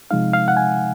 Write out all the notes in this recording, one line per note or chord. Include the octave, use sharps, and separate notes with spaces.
C3 F3 G#3 D#4 F5
F5
F#5
G#5